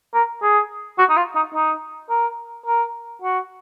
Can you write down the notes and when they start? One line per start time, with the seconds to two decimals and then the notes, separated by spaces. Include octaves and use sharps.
0.14 A#4
0.43 G#4
0.99 F#4
1.10 D#4
1.17 F4
1.36 D#4
1.55 D#4
2.10 A#4
2.67 A#4
3.22 F#4